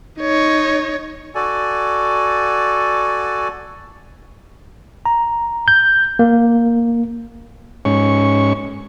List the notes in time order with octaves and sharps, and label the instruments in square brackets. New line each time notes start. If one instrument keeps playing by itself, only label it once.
[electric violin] D#4 C#5
[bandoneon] F#4 A4 D5 G#5
[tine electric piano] A#5
G6
A#3
[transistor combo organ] G#2 C#4 C#6